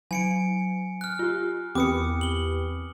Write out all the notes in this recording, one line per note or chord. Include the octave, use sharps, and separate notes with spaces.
F#3 G#5 C#7 D7
F6 F#6
F4 G4
E2 C4 G4 B4 D6 D#6 C#7
F#7 G7